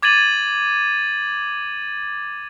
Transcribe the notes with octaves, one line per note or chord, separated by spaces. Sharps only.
D6 G#6 A6 D#7 F#7